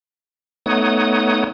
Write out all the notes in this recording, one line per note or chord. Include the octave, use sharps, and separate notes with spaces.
A3 B3 D#4 C#5 F#5 D#6